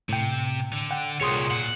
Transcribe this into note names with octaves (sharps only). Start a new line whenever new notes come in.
A2 C3 G5
D3
F#5 G5
C2 A#2 G#4 C#5 C6 D#6
A#2 F#5